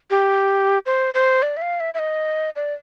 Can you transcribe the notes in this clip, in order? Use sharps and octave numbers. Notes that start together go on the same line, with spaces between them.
G4
C5
C5
D5
E5
F5
E5
E5
D#5
D5